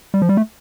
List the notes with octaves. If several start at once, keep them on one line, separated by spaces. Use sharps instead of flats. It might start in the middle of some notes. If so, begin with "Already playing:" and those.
G3
F3
G3
A3